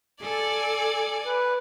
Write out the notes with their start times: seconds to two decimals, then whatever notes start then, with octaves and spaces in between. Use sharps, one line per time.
0.22 A4 D5 G#5
1.26 B4